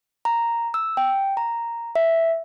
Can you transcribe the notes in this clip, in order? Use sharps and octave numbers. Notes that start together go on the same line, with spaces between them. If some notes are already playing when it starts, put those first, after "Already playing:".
A#5
E6
G5
A#5
E5